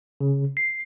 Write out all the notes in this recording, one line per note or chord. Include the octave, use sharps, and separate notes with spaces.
C#3
C7